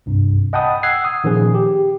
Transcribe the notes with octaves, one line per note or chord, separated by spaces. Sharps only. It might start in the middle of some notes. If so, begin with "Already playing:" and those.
C2 G2 C3
D#5 F#5 G5 A5 B5 D#6
F#5 E6 F#6 G#6 C7
D#6
A#2 D#3 F3 C#4 G#4
G4